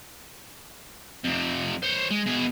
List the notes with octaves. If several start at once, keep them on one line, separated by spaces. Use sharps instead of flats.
F2 C3
C5 C#5
G#3
B2 G#4